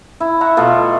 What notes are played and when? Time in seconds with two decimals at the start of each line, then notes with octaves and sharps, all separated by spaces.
0.20 E4
0.41 E5 F#5 A#5 C#6
0.57 B2 A3 F4